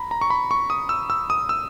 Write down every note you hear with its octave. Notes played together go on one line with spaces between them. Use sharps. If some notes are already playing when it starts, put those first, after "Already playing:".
Already playing: A#5 B5
A#5
C#6
B5
C#6
D#6
E6
E6
D#6
E6